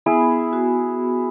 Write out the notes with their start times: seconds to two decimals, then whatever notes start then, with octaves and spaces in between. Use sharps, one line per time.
0.06 B3 E4 G#4
0.53 F#4